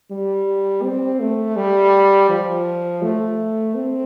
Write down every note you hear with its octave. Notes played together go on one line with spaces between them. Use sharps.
G3
C4
A3
G3
F3
A3
C4